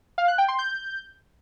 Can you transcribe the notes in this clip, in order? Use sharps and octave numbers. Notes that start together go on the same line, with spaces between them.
F5
F#6
G5
C6
G6